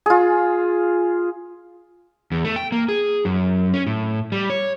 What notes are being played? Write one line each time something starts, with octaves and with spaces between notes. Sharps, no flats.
F4 G#4
E2
A3
G5
A#3
G#4
F#2
C#4
A2
G3
C#5